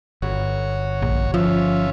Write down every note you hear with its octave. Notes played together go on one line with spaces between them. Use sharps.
G1 F#4 C#5
A#1
F3 C#4 F4 E5